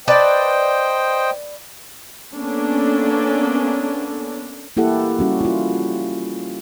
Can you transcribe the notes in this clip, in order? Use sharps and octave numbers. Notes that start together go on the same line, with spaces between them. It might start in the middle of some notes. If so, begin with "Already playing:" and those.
B4 C5 D5 D#5 G5 A5
A#3 B3 C#4 D4 A4
A#3 E4 G4 A4 F#5
G3 C#4 F#4
E4 F4